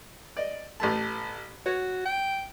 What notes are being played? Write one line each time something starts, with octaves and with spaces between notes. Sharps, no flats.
D5 D#5
A1 A3 A5
F#4 C#5
G5